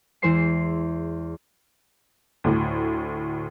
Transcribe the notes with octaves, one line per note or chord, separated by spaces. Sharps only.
E2 E3 G#3 C5 C6 C7
D2 A2